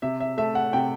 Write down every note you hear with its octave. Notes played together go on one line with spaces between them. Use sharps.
C3 E5
E5
A3 E5
F#5
C3 G5